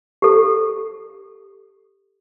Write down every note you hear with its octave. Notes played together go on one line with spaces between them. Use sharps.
G4 A4